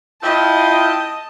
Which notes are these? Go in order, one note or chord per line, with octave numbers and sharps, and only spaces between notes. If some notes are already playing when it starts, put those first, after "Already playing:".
E4 F4 D#5 G5 A5